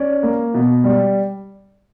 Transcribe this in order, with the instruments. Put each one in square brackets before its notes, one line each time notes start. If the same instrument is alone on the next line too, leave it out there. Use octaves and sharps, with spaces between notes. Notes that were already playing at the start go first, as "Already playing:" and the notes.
Already playing: [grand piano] C#4 D5
A#3
B2
G3